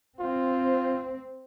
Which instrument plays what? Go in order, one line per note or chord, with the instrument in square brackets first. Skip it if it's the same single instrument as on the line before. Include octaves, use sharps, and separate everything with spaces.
[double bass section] C4 [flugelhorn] F4